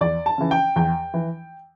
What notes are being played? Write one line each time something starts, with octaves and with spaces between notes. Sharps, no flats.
E2 D5
A5
C#3 E3
G5
E2 G5
E3